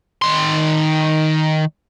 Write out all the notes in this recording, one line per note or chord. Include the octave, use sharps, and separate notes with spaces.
D#3 C6